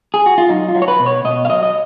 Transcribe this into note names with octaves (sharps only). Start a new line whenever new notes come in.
G#4
F#4
F4
F#3 D#4
F4
F#3
C#5
B4
B2
C#5
B2 D#5
F5
F#3 D#5
D#5